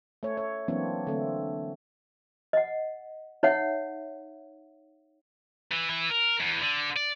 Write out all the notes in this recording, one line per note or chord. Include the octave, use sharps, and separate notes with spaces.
A3 C#5
C#5
E3 F#3 A#3 C4 D4 C#5
D3 A3 C4
D#5 F#5
D#4 C#5 E5 F#5
E3
E3
A#4
E2
D3
D5